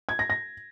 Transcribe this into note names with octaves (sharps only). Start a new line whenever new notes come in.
G#6
A#6
A#6